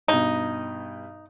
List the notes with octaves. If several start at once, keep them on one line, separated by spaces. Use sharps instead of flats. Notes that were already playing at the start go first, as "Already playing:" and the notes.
G2 B2 D#4